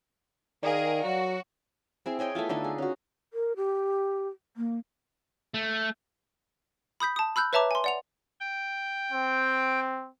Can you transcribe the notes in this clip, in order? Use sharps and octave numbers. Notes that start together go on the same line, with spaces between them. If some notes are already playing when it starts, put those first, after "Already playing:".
D#3 G#4 A#4 D5 F5
F#3 F#4
C4 E4 G#4
G#4 C#5 D#5 G5
A3 B3 E4 F4
D3 A3 D#4
G#4
C#4 F#4
A#4
G4
A#3
A3
B5 D#6 G6 B6
A5 D#6
B5 E6 F#6 G6
B4 C#5 E5 A5 A#5 D6
G#5 C6
D5 F#5 F7
G5
C4